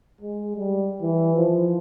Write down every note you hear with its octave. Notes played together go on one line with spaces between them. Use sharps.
G#3
G3
E3
F3